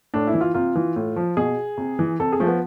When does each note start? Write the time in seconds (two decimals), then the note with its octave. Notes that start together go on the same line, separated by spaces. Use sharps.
0.14 A2 D4
0.27 E4
0.34 E3
0.41 F4
0.54 C3 F4
0.75 E3
0.96 A2
1.16 F3
1.37 B2 G#4
1.78 C3
1.99 E3
2.20 C3 A4
2.32 G#4
2.40 F3 A3
2.47 B3